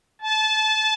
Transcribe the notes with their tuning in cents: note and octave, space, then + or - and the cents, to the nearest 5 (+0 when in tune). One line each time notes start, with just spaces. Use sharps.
A5 -25